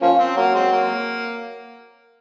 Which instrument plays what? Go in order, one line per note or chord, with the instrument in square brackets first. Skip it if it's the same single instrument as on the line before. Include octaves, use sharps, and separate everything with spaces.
[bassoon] F3 [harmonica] A#3 C#4
[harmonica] C4
[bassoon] F#3 [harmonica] A#3
[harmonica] G#3 C4
A#3